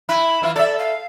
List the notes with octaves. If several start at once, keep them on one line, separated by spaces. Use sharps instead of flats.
E4 B5
E3 E4 F4
A4 D5 E5
F5